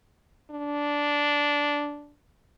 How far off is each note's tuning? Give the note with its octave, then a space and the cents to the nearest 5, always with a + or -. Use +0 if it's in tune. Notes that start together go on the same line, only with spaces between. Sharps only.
D4 -10